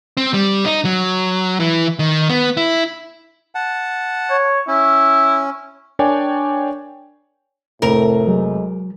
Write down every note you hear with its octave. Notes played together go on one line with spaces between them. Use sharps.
C4
G3
D#4
F#3
E3
D#3
B3
E4
F#5 A5
C#5
C#4 E4
D4 A#4 C#5 D5 G5 G#5
F1 A2 A3 A#4 F7
F#3 G#3